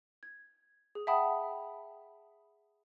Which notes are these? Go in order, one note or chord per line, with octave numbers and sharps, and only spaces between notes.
G#6
G#4
E5 F#5 G5 A5 B5 D#6